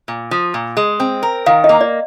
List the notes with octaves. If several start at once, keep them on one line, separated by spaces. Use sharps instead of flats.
A#2
F3
A#2
G#3
C4
A#4
D#3 F5
D#5
A#3
D5